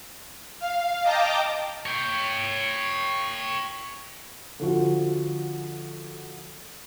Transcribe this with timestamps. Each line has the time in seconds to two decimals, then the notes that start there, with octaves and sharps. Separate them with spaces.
0.59 F5
1.03 D#5 G5 A5 A#5 D6
1.86 C#5 G5
4.60 D3 F3 F#4